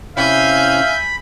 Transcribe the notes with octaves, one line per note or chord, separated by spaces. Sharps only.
C3 C#4 E4 E5 F5 G#5 B5 G6